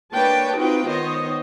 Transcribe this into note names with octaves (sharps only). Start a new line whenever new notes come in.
A#3 D4 B4 C#5 G5 A5
C4 D#4 F4 F#4 B4 G5
D#3 B3 C5 C#5 D#5